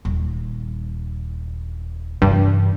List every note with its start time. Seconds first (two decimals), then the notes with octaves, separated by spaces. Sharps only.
0.05 D#1
2.22 G2 C3 E3